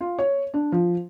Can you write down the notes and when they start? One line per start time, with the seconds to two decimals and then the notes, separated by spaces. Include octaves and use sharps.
0.01 F4
0.19 C#5
0.54 D4
0.72 F3